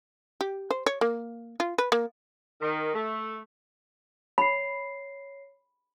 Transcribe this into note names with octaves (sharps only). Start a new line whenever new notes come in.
G4
C5
C#5
A#3
F4
B4
A#3
D#3
A3
C#5 B5 C7